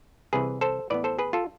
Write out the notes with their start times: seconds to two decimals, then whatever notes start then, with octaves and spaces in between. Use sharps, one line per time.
0.33 C2 C3 E3 G#4 B4
0.61 A4 C5
0.90 A2 E3 B3 B4 D5
1.04 A4 C5
1.19 G#4 B4
1.33 F4 A4